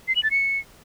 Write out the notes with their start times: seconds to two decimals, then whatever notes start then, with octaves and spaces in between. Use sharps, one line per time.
0.08 C7
0.16 F#7
0.23 A6
0.31 C#7